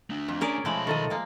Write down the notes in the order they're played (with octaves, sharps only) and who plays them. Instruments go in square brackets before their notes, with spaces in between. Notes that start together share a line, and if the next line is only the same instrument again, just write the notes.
[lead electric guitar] A3 D4
[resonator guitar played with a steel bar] F2
[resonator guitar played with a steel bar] C#4 [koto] G#4 A#4 D5
[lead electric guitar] B1 B5 [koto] F3 G#3 A3
[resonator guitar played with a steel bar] D#3 A4 D#5
[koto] G#3 A#3